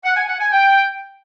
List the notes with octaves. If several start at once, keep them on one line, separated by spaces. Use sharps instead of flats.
F#5
G#5
F#5
G#5
G5